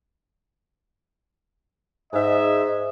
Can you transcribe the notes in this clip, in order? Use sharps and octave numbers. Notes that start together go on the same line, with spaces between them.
G#2 D#5 E5